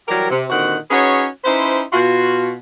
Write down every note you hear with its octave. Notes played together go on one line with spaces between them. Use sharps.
E3 F#3 G3 G4 A#4
C3
A#2 D3 D#3 C4 F#4 F#5
C#4 D#4 F#4 G#4 B4 C#5
C#4 D#4 E4 B4 C5
B2 F4 F#4